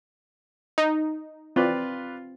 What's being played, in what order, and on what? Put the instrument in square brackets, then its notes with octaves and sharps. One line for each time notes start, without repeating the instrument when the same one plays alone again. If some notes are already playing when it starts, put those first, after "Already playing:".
[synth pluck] D#4
[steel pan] C4 [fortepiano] F4 B4 D5